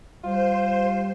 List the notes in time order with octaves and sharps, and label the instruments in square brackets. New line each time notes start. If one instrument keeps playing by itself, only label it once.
[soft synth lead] G3 [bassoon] F4 [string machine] C5